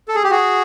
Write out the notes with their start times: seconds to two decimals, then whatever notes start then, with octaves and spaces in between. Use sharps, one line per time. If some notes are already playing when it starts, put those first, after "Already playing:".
0.08 A4
0.15 G#4
0.23 G4
0.30 F#4 G#4